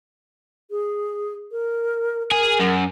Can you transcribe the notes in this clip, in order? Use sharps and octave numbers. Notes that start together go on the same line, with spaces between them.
G#4
A#4
G#4 A#4
F#2